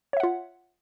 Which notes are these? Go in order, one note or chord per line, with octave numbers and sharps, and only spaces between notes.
F4 C#5 E5 F#5